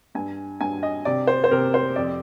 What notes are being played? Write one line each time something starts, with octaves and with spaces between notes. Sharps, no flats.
G2 G#5
G2 G#5
D#5
C3 D5
C5
C5
C3 A#4
C5
F2 D5